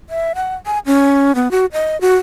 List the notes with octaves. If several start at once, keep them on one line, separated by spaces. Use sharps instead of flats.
E5
F#5
G#5
C#4
B3
F#4
D#5
F#4